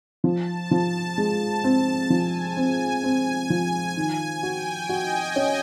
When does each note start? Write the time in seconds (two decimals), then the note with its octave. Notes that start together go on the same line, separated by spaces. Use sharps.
0.24 F3 A5
0.71 F3
1.18 G#3 A5
1.64 C4
2.10 F3 G#5
2.57 C4
3.04 C4
3.50 F3
3.96 D#3 G#5
4.43 F#4 G5
4.89 F#4 D#5
5.36 C#4